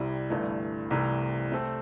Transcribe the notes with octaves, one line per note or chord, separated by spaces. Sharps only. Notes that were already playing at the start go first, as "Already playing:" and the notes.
Already playing: C2 C3 G3 E4
G1 G2 E3 A3
C2 C3 E3 A3 E4
C3 A3 C4 A4